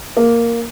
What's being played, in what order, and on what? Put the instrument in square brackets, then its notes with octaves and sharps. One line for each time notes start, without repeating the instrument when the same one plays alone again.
[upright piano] A#3